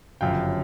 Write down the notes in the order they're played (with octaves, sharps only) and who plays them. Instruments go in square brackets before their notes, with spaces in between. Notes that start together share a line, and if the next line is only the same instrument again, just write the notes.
[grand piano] G1 F#2 C#3 F3 F5 G5